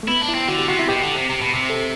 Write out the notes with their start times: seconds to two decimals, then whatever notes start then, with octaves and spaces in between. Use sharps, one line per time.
0.03 A3
0.08 B3 E4
0.22 D4
0.28 E4
0.35 C4
0.48 D3 F#4
0.59 G4
0.68 C3 F#4
0.79 E4
0.88 B2 G4
1.02 D3
1.15 C3
1.29 C3
1.41 B2
1.53 C3
1.70 A4